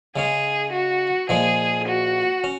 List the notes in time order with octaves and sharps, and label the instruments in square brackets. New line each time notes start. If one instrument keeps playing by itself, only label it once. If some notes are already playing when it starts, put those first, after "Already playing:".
[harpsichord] C#3 G#3 C#4 [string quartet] G#4
[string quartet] F#4
[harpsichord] A#2 F3 G#3 [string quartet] G#4
[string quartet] F#4
[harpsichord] C#4